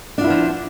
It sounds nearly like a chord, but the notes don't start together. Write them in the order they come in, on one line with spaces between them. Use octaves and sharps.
D4 F4 E4 B3 F3